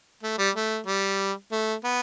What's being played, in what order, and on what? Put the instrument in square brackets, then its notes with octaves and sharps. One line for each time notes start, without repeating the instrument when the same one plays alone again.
[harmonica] A3
G3
A3
G3
A3
B3